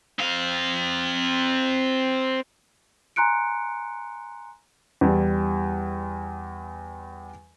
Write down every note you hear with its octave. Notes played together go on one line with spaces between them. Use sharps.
C4 F5
G#5 A#5 C6 F#6 C#7 D7
E2 G3